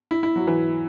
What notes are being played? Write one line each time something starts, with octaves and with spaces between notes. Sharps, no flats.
E4
E4
F#3
E3